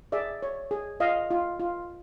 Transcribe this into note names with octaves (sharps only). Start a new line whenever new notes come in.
G#4 D5 E5
C#5
G#4
F4 D#5 F5
F4
F4